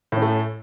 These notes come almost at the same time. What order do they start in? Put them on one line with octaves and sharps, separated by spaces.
A2 C#4 A3